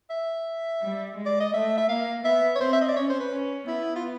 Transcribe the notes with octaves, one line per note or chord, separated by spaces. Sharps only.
E5
G3
G#3
D5
D#5
A3 E5
E5
A#3 F5
B3 E5
C#5
C4 C5
E5
D#5
D5
C#4 C#5
C5
B4
C#4
B3 E4
F4